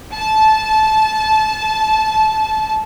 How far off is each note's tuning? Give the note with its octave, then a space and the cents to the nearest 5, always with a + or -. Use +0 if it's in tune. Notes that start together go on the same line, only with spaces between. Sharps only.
A5 -15